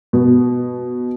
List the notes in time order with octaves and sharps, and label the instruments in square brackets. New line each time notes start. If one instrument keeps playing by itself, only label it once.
[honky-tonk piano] B2